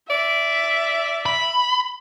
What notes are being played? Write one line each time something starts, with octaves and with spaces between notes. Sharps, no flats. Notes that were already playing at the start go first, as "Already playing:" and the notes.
D5 E5
B5